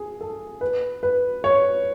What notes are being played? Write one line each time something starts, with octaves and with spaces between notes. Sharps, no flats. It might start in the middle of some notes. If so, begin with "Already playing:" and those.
Already playing: G#4
A4
B4
B4
C#5